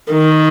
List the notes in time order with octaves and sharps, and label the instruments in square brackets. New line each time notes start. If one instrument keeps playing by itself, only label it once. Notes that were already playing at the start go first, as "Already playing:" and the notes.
[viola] D#3